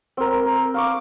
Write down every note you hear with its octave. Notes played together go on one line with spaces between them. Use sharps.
C4 A#4
A#4
F5 C#6 D6